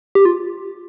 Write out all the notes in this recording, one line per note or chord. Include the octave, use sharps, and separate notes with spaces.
G4
F4